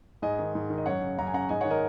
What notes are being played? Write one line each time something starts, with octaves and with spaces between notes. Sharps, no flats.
G#2 D#5 G#5
D#3
G#2
D#3
D#5
F#2 C#5 F#5
C#3
F#2 F#5 A#5
G#5
C#3 F#5 A#5
G#2 D#5 G#5
D#3 C#5 F#5
A#4 D#5